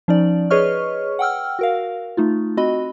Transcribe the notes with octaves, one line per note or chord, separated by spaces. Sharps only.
F3 C#4 D#4 D5
G#4 B4 C#5 D#5 C#6 F6
F#5 G5 E6 F6
F#4 A#4 F5
A3 D#4 F4
C4 F#4 D#5 B5